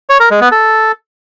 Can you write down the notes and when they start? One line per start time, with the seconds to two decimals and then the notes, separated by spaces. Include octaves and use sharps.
0.09 C#5
0.20 A#4
0.31 G#3
0.41 B3
0.52 A4